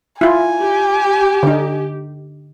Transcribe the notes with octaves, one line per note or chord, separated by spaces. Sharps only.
E4 F4 G#5
G4
D3 D#4